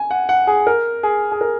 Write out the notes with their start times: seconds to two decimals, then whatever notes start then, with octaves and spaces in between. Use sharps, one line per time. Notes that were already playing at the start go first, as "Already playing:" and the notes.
Already playing: G#5
0.11 F#5
0.29 F#5
0.47 G#4
0.67 A#4
1.03 G#4
1.32 G#4
1.41 A#4